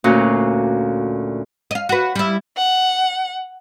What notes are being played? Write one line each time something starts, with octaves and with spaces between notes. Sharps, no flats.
D2 A#2 C#4 F#4 F5
D#5 F5
F#4 B4
G3 E4
F#5